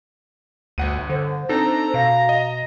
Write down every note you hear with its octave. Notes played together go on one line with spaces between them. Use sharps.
G1 D2 F#5 D#7
D3 C5
C4 D4 D#4 A4 A#5
B2 F5
D#5